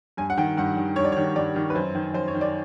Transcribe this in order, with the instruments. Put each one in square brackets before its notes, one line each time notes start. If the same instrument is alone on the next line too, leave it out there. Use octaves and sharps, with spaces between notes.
[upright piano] G2 G#5
F#5
D#3 G5
G2 F#5
D#3
G2 C#5
D5
C#5
D#3
G2 D5
D#3
B4
F#2 C5
D#3
F#2 C5
C#5
D#3
D5